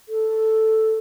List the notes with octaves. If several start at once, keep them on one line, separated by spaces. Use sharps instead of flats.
A4